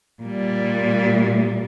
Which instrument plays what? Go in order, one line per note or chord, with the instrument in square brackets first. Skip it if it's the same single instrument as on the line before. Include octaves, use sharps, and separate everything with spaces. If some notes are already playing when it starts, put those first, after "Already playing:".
[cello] A#2 G3